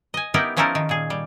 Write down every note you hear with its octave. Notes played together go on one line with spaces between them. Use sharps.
D#5 G#5
B3 D#4 E4 G4 A#4 B4
F3 C#4 D#4 E4 A4 A#4
D#3
A#2 G#4
G3